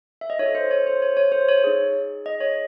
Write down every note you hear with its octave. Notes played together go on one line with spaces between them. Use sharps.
E5
D#5
D#4 F#4 A4 C#5
C5
C#5
C5
C#5
C#5
C5
C#5
D#4 G#4
D#5
C#5